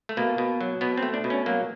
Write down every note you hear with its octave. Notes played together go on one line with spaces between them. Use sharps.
A3
B2 A#3
B2
F#3
B2 B3
C4
A3
D4
B2
C#4
F#3 A#3